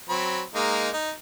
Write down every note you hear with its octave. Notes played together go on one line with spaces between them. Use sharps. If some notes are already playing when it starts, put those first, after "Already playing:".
F#3 C4 B5
G#3 A#3 D#4
D#4